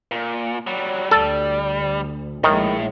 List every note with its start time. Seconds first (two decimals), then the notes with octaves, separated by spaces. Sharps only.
0.12 A#2
0.67 F#3 G3
1.11 D2 G3 A4
2.44 A#1 A2 D#3 G#3